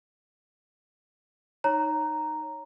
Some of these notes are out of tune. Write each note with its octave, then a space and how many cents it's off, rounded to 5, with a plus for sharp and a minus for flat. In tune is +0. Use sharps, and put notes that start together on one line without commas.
D#4 -5 C#5 +0 A#5 +0